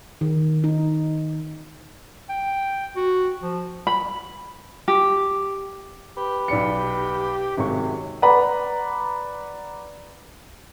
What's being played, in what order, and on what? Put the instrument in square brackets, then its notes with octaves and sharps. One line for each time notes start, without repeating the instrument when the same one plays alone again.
[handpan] D#3
D#4
[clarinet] G5
F#4
F3
[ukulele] B5
G4
[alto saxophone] G4 [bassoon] B4
[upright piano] B1 D5 C#7
[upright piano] G#1 C3 C#6 [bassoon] F#2 [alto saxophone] G#3
[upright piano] B4 D5 F#5 A#5 B5